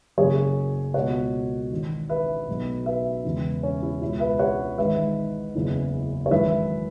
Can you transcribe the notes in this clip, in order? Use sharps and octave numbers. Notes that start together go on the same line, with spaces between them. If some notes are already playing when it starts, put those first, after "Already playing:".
F#1 F#2 C#3 G#4 C#5
C#2 B2 C#5 F#5
G#1 G#2 E3
B4 E5
B1 B2
B4 E5
E1 E2 C#3 E3
C#4
E4
C#2 B2 E4
B4 E5
C#5 F#5
G#1 G#2 E3 B4 E5
F#1 E2 C#3 E3
C#5
G#1 F#2 E3 B4 E5